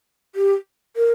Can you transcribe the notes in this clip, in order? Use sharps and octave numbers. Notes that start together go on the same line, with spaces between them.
G4
A#4